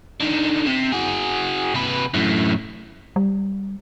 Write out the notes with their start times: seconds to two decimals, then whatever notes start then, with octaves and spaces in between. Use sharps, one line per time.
0.21 D3 D#3
0.66 C3
0.92 F#4 G#4
1.75 C3 B4
2.14 F#2 A2
3.16 G3